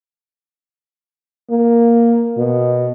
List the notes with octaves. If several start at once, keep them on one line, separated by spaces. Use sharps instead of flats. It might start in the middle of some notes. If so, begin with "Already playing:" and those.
A#3
B2